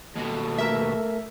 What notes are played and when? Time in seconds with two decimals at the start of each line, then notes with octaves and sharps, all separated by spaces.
0.16 D#2 B2 A4
0.58 A3 A#4 E5